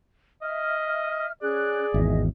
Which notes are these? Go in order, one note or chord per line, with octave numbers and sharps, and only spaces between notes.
D#5 E5 F6
C#4 G#4 D5 F#6
G#1 E2 D#5 E5